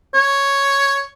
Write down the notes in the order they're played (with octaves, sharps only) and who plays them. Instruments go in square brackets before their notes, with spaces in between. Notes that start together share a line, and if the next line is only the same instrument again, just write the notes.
[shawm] C#5